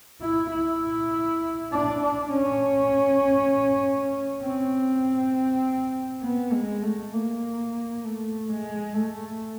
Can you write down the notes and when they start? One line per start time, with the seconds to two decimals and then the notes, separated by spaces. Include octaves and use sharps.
0.21 E4
0.51 E4
1.72 D4
2.02 D4
2.32 C#4
4.43 C4
6.23 B3
6.53 G#3
6.83 A3
7.13 A#3
8.04 A3
8.49 G#3
8.94 A3